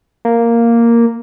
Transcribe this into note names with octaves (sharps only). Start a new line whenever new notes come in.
A#3